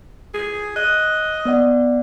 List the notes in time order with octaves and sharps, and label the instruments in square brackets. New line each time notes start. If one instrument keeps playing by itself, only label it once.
[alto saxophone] G#4
[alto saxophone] D#5 [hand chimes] F#6
[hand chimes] B3 D5 F#5